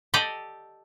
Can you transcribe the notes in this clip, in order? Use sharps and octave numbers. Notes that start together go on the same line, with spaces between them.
G4 A4 D5 D#5 G5